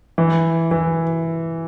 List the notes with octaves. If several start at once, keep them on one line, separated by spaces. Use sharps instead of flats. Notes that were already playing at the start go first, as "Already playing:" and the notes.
E3
E3